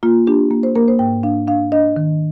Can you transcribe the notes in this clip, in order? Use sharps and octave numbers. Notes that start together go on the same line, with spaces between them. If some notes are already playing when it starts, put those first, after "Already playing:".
A#3 F4
D4 G4
A#3
C5
A#3 A#4
C5
G#2 G5
D4 F5
D4 F5
D4 D#5
D#3